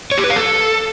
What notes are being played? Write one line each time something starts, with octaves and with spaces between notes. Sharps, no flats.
C#5
G4
B4
F5
A4